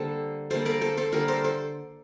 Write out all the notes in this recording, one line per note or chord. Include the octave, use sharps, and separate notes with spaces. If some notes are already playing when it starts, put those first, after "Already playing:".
Already playing: D3 G3 A#3 A4 C5
D3 G3 A#3 A4 C5
A#4 D5
A4 C5
A4 C5
D3 G3 A#3 A#4 D5
A4 C5
A4 C5